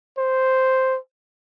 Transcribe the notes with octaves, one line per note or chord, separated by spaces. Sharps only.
C5